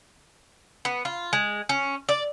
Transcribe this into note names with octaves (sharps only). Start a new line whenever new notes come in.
B3
F4
G#3
C#4
D5